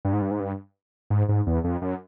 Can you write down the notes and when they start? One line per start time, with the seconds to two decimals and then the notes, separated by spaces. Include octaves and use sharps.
0.05 G2
0.13 G#2
0.22 G2
0.31 G#2
0.40 G2
1.10 G#2
1.29 G#2
1.47 E2
1.64 F2
1.82 F#2